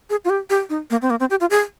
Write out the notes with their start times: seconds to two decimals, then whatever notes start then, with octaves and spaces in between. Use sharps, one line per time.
0.10 G#4
0.25 F4
0.30 G4
0.50 G4
0.70 D#4
0.90 A#3
1.02 C4
1.10 A#3
1.20 C4
1.30 G4
1.41 F4
1.50 G#4